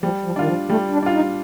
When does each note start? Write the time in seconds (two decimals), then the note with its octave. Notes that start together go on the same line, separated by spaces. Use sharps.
0.03 F3 G3
0.25 F3
0.36 D#3 D4 F4
0.47 F3
0.69 G3 A3
0.92 D4
1.03 D4 F4
1.14 D#4